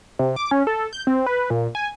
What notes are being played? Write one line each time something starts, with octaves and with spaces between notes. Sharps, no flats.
C3
D6
C#4
A4
G6
C4
B4
A#2
G#5